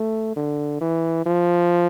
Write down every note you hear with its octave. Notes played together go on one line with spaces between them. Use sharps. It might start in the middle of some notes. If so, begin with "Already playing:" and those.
Already playing: A3
D3
E3
F3